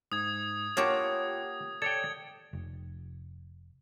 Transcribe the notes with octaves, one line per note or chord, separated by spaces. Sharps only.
G#2 D#6 G#6
A#3 F4 G4 C#5 F#5 G5 A5
A4 C#5 D5 G5 G#6
F1